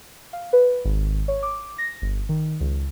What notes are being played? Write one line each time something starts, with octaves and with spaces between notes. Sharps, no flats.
F5
B4
G#1
C#5
D6
A#6
G1
D#3
C#2